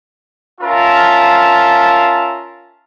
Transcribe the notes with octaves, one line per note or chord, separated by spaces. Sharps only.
C#4 F4 A#4 E5 A5